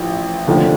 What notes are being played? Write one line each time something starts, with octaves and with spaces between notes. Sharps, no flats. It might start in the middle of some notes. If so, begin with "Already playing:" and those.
Already playing: A1 F3
F1 D#2 D3 F3 A3